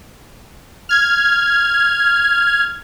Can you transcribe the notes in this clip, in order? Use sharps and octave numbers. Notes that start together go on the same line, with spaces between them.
F6 G#6